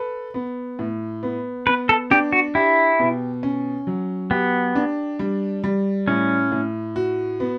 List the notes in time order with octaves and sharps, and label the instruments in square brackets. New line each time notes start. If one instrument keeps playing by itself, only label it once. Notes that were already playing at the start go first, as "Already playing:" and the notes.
Already playing: [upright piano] A4 B4
B3
A2
B3
[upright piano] B3 [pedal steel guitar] B4
[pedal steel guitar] A4
[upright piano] D4 [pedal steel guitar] G4
[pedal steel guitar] F#4
[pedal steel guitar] E4 [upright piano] G4
[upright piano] B2
C#4
F#3
[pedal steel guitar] B3 [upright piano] G4
[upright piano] D4
G3
G3
[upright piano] A2 [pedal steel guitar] C#4
[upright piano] A2
F#4
B3